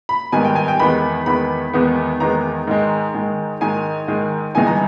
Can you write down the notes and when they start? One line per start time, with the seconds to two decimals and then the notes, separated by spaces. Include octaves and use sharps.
0.09 B5
0.32 G#1 G#2 D#3 G3 B3 G#5
0.45 G5
0.56 G#5
0.68 G5
0.80 E2 D#3 G#3 B3 B5
1.26 E2 D#3 G#3 B3 B5
1.73 E2 D#3 G#3 B3
2.20 E2 D#3 G#3 B3 A#5
2.67 G#2 D#3 G#3
3.14 G#2 D#3 G#3
3.61 G#2 D#3 G#3 G#5
4.08 G#2 D#3 G#3
4.55 G1 G2 E3 G#3 D#4 G#5
4.67 A#5